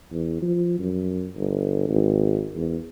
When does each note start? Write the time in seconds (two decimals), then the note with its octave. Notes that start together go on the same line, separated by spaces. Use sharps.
0.12 E2
0.42 F3
0.79 F#2
1.36 G1
1.89 G#1
2.55 E2